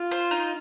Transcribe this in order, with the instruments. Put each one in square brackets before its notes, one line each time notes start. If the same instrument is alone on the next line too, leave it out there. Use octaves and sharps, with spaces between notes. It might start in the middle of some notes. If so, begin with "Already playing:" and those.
Already playing: [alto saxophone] F4
[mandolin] C5
D#4